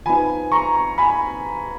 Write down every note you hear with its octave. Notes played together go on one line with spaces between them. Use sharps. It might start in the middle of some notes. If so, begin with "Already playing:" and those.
F3 B3 D#4 G#5 B5
A#5 C#6
G#5 B5